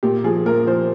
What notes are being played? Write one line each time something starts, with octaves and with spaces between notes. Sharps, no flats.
A#2 G4
F3 G#4
A#2 A#4
F3 C5